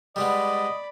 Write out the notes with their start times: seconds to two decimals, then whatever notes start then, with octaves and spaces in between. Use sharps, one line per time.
0.16 G3 G#3 B3 D5 D#5 B5